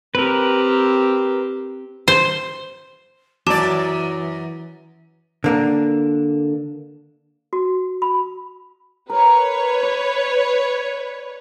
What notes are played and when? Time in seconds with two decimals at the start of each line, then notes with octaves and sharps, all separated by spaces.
0.15 C4 G4 A#4 B4
2.08 C5
3.47 F#2 E3 F#3 D5 A5 D6 E7
5.44 D3 A#3 D4
7.53 F#4
8.02 B5
9.10 A#4 B4 C#5
9.83 D5